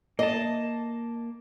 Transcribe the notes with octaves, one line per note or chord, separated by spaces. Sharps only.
A#3 D#5 A5